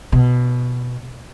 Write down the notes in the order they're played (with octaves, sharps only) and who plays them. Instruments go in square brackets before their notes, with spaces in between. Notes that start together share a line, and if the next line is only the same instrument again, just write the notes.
[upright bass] B2